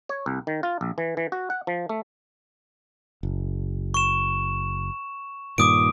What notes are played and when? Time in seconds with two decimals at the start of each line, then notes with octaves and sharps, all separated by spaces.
0.09 C#5
0.26 C2
0.47 D#3
0.63 F4
0.81 A#1
0.98 E3
1.17 E3
1.32 F#4
1.50 F#5
1.67 F3
1.89 A3
3.23 F#1
3.94 C#6 E7
5.58 G2 A#2 D#3 D6 D#6 D7